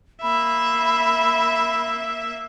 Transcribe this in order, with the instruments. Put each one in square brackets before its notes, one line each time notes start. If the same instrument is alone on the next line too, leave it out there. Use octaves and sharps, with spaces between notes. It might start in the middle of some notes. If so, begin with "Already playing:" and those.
[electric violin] A#3 E5 [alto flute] B5